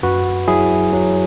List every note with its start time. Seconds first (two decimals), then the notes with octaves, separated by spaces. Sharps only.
0.03 F#2 F#4 B4
0.48 F#3 E4 G#4
0.93 F#3